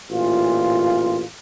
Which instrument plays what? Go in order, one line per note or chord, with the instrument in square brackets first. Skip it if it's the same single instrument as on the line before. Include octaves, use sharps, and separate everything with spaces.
[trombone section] A1 A#2 F4